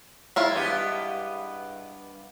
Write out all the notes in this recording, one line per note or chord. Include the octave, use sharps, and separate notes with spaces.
G#3 E4 F4
G2 B3 G4